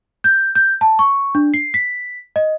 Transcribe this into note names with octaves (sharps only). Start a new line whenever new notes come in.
G6
G6
A5
C#6
D4
C7
B6
D#5